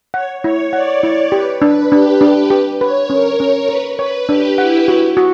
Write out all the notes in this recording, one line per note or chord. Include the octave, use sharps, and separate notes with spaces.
C#5 F#5
E4 C#5
D5 F#5
E4 C#5
G4 B4
D4 B4
D4 G4
D4 B4
G4
B4 C#5
C#4 A#4
C#4 A#4
A#4 B4
B4 C#5
D4 G4
E4 F#5
E4 F#4
F#4